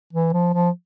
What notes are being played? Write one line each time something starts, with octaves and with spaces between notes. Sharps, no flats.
E3
F3
F3